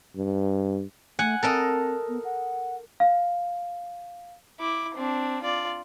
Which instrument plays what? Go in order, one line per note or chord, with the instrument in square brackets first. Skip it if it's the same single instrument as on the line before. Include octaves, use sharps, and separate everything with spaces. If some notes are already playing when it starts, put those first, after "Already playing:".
[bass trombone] G2
[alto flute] A3 [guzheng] F#5 G#5
[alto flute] C4 [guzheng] A4 A#4 D#5
[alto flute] B3
F#5
[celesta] F5
[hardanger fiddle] E4 D6
C4 D4
F4 D5